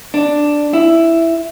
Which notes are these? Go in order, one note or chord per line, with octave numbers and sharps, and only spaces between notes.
D4
E4